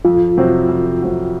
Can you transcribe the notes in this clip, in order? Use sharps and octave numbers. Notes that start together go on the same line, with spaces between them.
F2 F4
C3 F#3 C4 F#4
F2
C3 F#3 C4 F#4